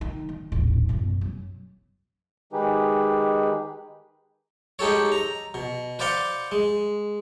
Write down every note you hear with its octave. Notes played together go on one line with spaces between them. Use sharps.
D#3
D#3
D#1 A1
F#1 B2
F#2
D#3 G#3 D#4 G4 G#4 B4
G#3 D#4 G4 A4 C#5
A#5
B2
B4 C5 D5 F5 F#5 C6
G#3